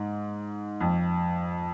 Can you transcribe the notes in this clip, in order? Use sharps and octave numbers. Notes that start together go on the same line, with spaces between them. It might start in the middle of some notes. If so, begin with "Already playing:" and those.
Already playing: G#2
F2